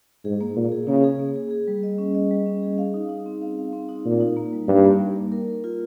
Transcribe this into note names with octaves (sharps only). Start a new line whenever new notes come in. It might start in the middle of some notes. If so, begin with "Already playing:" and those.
G#2 G#4
A#3
A#2 A#3
G#4
C#3 A#3
G#4
A#3
G#4
G#4
G3
D#5
C#4
D#5
G3
C#4
G#4
F5
D#4
D#4
C4
F5
F5
C4
D#4
A#2 D#4
D#4
A#3
G3
G2 G3
A#3
A#3
A#3
A#4
A#4
F4